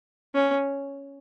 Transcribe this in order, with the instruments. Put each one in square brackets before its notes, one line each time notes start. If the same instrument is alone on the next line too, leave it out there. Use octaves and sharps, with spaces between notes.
[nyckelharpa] C#4